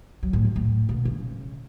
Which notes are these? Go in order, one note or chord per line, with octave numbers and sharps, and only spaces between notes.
F#3
A2
E2
A2
B2
C#3